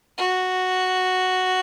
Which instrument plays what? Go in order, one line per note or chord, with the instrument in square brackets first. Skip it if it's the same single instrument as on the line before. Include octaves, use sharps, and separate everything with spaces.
[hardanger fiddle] F#4